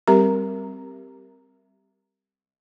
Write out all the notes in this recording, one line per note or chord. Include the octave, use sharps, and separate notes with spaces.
G3 C4 G4 A#4 A#5